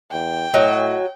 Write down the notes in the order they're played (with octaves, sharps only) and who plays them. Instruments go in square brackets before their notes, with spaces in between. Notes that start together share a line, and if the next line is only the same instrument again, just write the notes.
[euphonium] E2 [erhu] G5
[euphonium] A2 [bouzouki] F#3 [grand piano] D#5